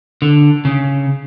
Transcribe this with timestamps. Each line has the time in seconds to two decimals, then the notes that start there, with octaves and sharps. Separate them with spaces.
0.22 D3
0.65 C#3